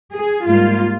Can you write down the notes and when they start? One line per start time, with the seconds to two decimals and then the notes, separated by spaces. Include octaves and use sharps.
0.13 G#4
0.47 G#2 G3 A#3 F4